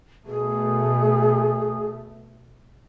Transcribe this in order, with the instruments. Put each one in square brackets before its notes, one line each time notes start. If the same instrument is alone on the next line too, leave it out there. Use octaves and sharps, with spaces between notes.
[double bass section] B2 A3 [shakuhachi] G#4